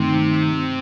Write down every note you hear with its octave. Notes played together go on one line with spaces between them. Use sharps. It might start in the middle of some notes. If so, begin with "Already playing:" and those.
Already playing: G2 C3 D#3 A3 C4 D#4